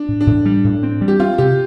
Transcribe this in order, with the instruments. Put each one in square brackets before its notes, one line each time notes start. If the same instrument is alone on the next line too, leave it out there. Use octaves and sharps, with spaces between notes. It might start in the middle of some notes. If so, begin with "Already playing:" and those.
Already playing: [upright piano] D4
[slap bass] A2
[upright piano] D4
[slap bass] A2
G3
A2
C4
G3
[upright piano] G4
[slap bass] C4 [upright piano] F4
[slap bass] C3 [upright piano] G4